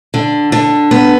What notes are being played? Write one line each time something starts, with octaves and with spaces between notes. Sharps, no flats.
D3
D3
B3